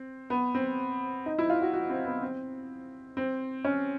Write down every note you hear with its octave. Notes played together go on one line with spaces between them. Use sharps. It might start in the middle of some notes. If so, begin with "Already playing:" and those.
Already playing: C4
B3
C4
D#4
E4
F4
F#4
F#4
C4
B3
C4
C4
C#4